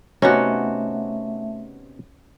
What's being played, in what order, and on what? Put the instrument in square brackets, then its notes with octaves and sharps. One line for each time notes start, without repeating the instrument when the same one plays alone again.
[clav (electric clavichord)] C3 B3 D#4 [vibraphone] A3 E5 [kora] C#4 F#4